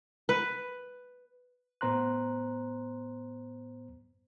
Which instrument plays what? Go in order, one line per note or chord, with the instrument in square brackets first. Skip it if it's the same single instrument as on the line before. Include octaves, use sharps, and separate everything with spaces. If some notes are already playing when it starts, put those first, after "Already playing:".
[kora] B4
[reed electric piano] A2 B3 C5 A#5 C6 F#6